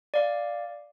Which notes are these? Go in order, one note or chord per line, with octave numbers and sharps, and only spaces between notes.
D5 F5